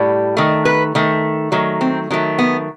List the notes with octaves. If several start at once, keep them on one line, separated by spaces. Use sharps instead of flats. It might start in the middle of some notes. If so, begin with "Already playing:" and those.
Already playing: A2 G3
D#3 A3
B4
D#3 A3
D#3 F#3 A3
C4
D#3 F#3 A3
B3